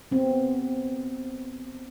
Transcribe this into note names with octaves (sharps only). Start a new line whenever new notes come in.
B3 C4